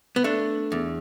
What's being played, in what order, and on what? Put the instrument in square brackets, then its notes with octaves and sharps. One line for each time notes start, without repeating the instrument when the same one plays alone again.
[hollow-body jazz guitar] B3
A3 D4
E2